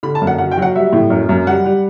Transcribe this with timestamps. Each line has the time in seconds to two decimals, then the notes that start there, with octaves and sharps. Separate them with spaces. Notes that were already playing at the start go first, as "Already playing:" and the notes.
0.03 D3 B5
0.15 A5
0.22 F#2
0.27 F#5
0.38 F#3 F#5
0.51 G5
0.58 F#3 F#5
0.75 G3 E5
0.93 A2
1.10 F#2
1.29 F#2
1.47 G3 F#5
1.65 G3